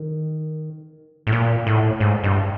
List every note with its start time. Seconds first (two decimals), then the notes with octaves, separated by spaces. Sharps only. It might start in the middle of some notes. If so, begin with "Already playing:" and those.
Already playing: D#3
1.27 A2
1.32 A#2
1.67 A2
2.00 G#2
2.24 G2